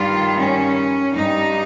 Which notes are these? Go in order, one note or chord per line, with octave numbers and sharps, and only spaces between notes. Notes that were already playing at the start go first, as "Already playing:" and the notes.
Already playing: G2 D#3 G3 F4
C#4
G2 G3 D#4